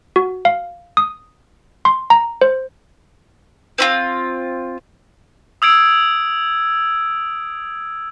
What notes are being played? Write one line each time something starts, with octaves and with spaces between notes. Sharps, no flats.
F#4
F5
D#6
C6
A#5
C5
C4 E4 F4
D#6 E6 G#6 D7